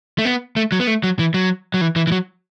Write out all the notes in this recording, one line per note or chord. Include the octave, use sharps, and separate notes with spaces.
A3
B3
A3
F#3
B3
A3
F#3
E3
F#3
F#3
E3
E3
E3
F#3